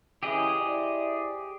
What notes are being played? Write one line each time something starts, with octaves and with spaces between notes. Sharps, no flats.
C#3 E3 G4 G#4 D#5
E4 C5 D5